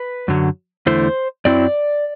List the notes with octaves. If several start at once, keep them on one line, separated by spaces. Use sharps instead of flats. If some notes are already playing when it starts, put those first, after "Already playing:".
Already playing: B4
F#2 D3 F#3
E2 D3 A3 E4 C5
F#2 F#3 C4 E4 D5